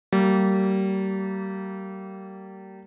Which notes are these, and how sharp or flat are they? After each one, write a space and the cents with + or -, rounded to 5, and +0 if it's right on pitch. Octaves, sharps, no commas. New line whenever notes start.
G3 -35 A#3 -30